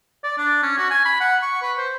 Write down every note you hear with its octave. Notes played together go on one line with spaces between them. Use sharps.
D5
D4
C#4
F#4
G#5
B5
F#5
C#6
B4
C5